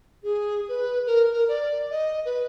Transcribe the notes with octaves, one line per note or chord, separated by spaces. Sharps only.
G#4
B4
A#4
A#4
D5
D#5
B4